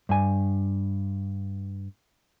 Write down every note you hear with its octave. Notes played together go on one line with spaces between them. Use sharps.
G2 G#5